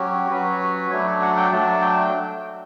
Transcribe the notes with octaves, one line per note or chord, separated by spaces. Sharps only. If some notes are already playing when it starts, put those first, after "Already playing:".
Already playing: F#3 C#4 F#4 G4
F#3 C#4 F#4 B4
F#3 A3 D4 C#5
F#5
G5
F#3 A3 D4 A5
G5